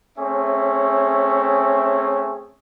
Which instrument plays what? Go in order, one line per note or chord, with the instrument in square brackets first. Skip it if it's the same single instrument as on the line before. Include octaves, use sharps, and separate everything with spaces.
[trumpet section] A3 C4 C#4 G#4 C#5 E5